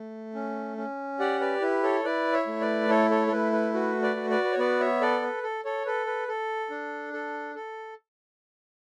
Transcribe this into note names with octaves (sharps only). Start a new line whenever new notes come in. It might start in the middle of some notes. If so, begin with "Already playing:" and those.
Already playing: A3
C#4
C#4
G4 D5 F#5
B4 D5
E4 B4
A4 C#5
E4 B4 D5
C#5 E5
A3
B4 D5
E4 A4 C#5
A4 C#5
A4
A3 B4
B4
F#4 B4
B4 D5
F#4
B4 D5
B4
C#5
B3 B4 D5
C#5 E5
A4 B4 D5
B4
A4
A4 C#5
A4 B4
B4
A4
D4
A4
A4